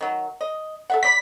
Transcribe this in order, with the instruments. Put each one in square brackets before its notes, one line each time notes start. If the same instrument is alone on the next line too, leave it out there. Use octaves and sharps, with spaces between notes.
[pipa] D#3 F#3
D#5
A4 E5 F#5
[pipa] A3 D5 B5 [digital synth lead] B6